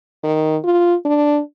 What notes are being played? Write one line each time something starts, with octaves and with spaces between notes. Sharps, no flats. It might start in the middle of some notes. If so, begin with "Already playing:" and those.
D#3
F4
D4